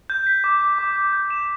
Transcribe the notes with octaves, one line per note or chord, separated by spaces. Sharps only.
G6
B6
D6
D6
D6
D6
G6
E7